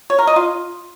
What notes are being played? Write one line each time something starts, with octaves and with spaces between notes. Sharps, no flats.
C#5
A#4
D#5
F4